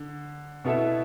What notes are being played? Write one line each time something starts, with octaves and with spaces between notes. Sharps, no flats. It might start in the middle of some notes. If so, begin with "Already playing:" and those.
Already playing: D3
B2 B3 E4 A4 E5